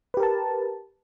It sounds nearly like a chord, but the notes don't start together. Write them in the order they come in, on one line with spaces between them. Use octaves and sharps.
B4 G4 A#4 A5